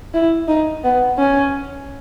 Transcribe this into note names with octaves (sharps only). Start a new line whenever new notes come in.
E4
D#4
B3
C#4